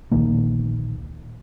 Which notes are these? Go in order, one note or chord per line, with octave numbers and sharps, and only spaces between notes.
D1 A#1 D#3 A#3